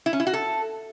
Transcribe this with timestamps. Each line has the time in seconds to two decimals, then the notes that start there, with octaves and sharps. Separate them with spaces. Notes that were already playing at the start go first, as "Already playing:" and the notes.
0.06 E4
0.13 C#4
0.20 E4
0.27 F#4
0.34 A4